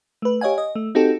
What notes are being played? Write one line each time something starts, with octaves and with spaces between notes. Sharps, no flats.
A3 B4
G4 C#5 D#5 F5 G#5
D#5
A3
C4 D#4 F#4 G4 A4